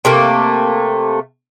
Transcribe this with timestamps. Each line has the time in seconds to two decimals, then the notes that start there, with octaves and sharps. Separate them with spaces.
0.05 C3 A3 A#3